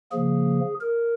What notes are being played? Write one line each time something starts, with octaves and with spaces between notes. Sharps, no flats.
C#3 F3 A#3 G#4
A#4